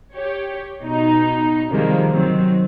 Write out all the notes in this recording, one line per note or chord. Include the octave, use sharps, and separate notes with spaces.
G4 C#5
B2 D#4
C3 D#3 F3 G3 G#3 A#3
D#3 F#3 C4